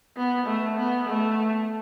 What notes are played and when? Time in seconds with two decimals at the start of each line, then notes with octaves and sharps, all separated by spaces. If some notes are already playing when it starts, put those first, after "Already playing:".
0.17 B3
0.47 A3
0.78 B3
1.08 A3